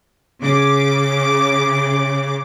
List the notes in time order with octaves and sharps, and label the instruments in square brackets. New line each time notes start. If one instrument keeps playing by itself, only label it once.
[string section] C#3 D6